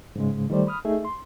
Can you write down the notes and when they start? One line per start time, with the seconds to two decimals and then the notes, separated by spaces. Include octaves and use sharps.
0.16 G#2 C#3 G#3
0.50 D#3 G3 A3 C5 D5
0.67 B5 D#6 F6
0.85 A3 D#4 G#4 E5
1.05 C6